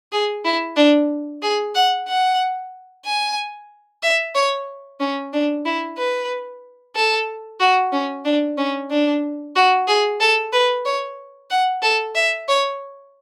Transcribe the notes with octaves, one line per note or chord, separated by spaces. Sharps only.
G#4
E4
D4
G#4
F#5
F#5
G#5
E5
C#5
C#4
D4
E4
B4
A4
F#4
C#4
D4
C#4
D4
F#4
G#4
A4
B4
C#5
F#5
A4
E5
C#5